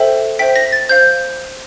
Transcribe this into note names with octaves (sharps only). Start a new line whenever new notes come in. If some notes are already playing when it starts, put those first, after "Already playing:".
Already playing: A4 C5 E5 G5
C5 E5 G5 B6
A#6
A6
C5 F5 G6